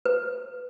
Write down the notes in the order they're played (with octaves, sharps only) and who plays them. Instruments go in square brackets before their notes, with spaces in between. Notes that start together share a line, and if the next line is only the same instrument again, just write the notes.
[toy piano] B4